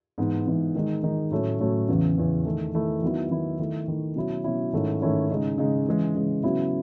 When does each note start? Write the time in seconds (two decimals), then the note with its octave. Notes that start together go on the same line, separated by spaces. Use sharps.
0.18 G#2 E3 B3
0.46 G#2 E3 B3
0.75 D#3 G#3 D#4
1.03 D#3 G#3 D#4
1.31 A2 F#3 A3 C#4
1.60 A2 F#3 A3 C#4
1.88 E2 C#3 E3
2.17 E2 C#3 E3
2.45 D#3 A3 E4
2.74 D#3 A3 E4
3.02 D#3 F#3 B3 E4
3.30 D#3 F#3 B3 E4
3.59 D#3 A3 E4
3.88 D#3 A3 E4
4.16 B2 F#3 C#4 E4
4.44 B2 F#3 C#4 E4
4.73 G#2 D#3 A3 C#4 E4
5.02 G#2 D#3 A3 C#4 E4
5.30 C#3 G#3 D#4
5.58 C#3 G#3 D#4
5.87 C#3 E3 G#3
6.15 C#3 E3 G#3
6.43 C#3 F#3 B3 E4